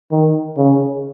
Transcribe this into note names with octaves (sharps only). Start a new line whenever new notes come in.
D#3
C#3